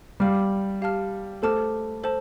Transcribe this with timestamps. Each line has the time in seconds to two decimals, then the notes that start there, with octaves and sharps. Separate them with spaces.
0.20 G3 F5 D6 F6
0.82 G4 F5 A5 F6
1.42 A3 A4 C5 A5 D6 F6
2.04 A4 C5 A5